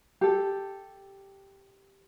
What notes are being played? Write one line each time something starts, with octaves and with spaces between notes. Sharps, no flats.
G4 A4